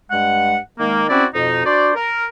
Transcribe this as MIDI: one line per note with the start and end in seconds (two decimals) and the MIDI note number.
0.10 0.57 43
0.10 0.57 56
0.10 0.57 78
0.78 1.04 51
0.78 1.04 56
0.78 1.04 58
1.09 1.24 60
1.09 1.24 61
1.09 1.24 64
1.09 1.24 66
1.09 1.24 74
1.34 1.63 41
1.34 1.63 47
1.34 1.63 63
1.65 1.91 62
1.65 1.91 66
1.65 1.91 72
1.65 1.91 74
1.95 2.24 70